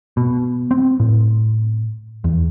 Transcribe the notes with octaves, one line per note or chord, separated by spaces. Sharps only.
B2
C4
A2
E2